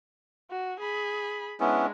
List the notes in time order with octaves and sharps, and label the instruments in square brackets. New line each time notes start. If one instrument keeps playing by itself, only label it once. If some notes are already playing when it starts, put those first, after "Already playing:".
[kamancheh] F#4
G#4 B5
[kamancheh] G#3 D4 [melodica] B3 C#4 E4